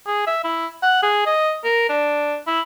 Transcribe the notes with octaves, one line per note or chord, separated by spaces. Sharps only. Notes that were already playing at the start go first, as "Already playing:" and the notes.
G#4
E5
E4
F#5
G#4
D#5
A#4
D4
E4